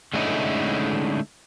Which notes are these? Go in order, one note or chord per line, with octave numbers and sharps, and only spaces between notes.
D3 G#3 A3 C#4 D#4 E4